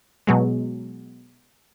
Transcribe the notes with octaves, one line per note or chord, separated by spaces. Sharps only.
B2 F#3 G#3